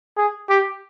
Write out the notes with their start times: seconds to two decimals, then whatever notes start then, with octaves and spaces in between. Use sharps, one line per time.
0.17 G#4
0.49 G4